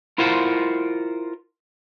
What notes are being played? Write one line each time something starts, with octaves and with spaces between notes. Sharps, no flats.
E4 F4 A#4 C5 F5 F#5